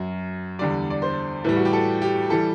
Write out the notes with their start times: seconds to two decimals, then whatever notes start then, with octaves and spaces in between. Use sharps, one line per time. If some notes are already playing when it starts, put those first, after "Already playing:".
Already playing: F#2 F#3
0.59 E2 D3 G3 D5
0.90 D5
1.02 C5
1.44 A2 E3 G3 B4
1.56 F#4
1.65 G4
1.73 A4
2.02 G4
2.30 E3 G3 A4